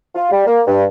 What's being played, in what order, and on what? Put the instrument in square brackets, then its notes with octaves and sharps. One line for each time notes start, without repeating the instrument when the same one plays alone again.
[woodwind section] F4
G3
A#3
G2